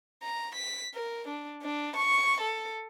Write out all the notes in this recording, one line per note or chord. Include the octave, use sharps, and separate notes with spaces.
A#5
B6
A#4
D4
D4
C#6
A4